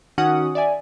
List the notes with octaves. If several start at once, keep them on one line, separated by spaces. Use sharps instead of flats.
D#3 C#4 D#4 F#4 F#5 D#6
D5 E5 G#5